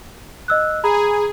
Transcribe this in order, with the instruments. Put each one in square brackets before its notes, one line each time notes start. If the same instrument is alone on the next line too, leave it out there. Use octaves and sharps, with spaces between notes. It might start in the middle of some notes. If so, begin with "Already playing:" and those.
[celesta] D#5 E6 F#6
[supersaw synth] G#4 [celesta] A#5 B5